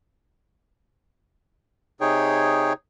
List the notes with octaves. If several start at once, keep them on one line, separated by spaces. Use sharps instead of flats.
C3 D#4 G#4 C#5 G5